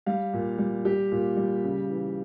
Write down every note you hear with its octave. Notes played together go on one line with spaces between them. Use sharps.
G3 F5
A#2
G3
G3 G4
A#2
G3
C#3
E3